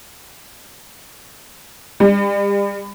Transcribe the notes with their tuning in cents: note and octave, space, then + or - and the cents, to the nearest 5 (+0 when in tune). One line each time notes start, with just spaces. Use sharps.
G3 +40